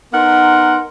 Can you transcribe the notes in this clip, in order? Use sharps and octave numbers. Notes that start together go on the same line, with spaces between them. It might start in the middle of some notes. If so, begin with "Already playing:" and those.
B3 D#4 A#4 F#5 C6